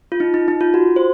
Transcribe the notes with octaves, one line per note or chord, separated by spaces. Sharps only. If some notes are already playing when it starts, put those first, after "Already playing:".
F4
D#4
D#4
D#4
F4
F#4
C5